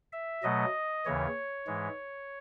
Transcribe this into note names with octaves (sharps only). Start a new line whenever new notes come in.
E5
B2 F#3 A3 D#5
D#2 C#3 E3 C#5
G#2 E3 G#3